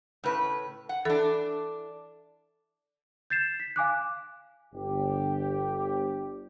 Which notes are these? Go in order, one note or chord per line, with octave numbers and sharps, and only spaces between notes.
A2 C#3 B4
F#5
E3 D4 A4
G6 A6 C7 E7
B6
F5 G#5 D6 F#6
G1 G4